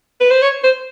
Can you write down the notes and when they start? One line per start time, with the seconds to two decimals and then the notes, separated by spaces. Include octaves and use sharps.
0.20 B4
0.31 C5
0.42 C#5
0.63 C5